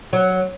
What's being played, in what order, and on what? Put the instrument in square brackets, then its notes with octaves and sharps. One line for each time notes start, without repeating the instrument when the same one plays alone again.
[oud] F#3